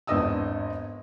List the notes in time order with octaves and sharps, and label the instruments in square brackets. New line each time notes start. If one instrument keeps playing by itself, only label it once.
[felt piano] G#1 E2 D4 D#5 D#6 E6